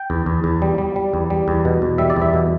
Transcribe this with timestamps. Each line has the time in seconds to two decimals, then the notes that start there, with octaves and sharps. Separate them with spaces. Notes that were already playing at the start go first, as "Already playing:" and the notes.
Already playing: G5
0.10 E2
0.26 E2
0.44 E2
0.62 G3
0.78 G3
0.96 G3
1.14 E2
1.30 G3
1.48 E2
1.65 B2
1.82 E2
1.98 G3 E5
2.10 D5
2.16 E2
2.22 E5
2.34 B2